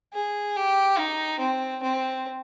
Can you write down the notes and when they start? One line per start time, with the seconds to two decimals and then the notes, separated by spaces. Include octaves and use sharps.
0.13 G#4
0.56 G4
0.98 D#4
1.40 C4
1.83 C4